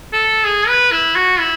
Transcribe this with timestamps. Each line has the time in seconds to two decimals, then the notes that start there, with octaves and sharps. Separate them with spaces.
0.13 A4
0.44 G#4
0.68 B4
0.92 E4
1.15 F#4
1.39 E4